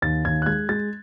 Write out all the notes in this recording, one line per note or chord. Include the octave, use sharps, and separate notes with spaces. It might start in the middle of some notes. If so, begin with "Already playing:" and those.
D#2 A6
D#2 G#6
F#6
G#3 G#6
G#3 A6